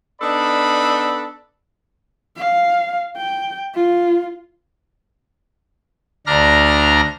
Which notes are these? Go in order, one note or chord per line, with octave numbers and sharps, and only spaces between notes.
B3 D4 D#4 A4 D5 B5
F5
G5
F4
D2 D4 A#5 F6